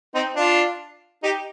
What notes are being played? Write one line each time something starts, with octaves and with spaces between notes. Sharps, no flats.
C4 D#4
D4 F4
D#4 G4